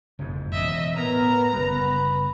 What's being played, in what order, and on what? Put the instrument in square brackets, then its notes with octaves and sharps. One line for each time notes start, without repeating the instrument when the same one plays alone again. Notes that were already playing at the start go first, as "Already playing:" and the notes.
[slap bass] F#1 F2 G#2
[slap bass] E1 C#3 [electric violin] D#5 E5
[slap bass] A2 [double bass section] B3 [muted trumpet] A#4 [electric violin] A#5
[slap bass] F#1 G3 [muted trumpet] B4